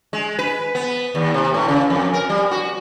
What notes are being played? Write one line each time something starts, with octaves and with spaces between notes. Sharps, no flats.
G#3
B4
B3
D#2
C3
A2
C#3
F2
A#4
G3
F#4